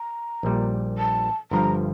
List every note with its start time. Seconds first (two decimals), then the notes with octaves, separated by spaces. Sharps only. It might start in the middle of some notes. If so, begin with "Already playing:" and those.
Already playing: A#5
0.43 A#1 A#2 G3
0.98 A5
1.51 G1 G2 F3 A#5